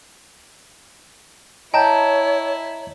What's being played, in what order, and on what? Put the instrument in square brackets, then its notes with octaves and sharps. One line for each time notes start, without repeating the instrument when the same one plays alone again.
[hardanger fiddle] E4 [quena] C#5 [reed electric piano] D#5 A#5 [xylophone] G5 A5 G6